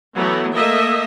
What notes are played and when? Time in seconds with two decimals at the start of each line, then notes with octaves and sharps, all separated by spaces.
0.15 E3 F#3 A3 B3
0.53 A3 A#3 D#5 E5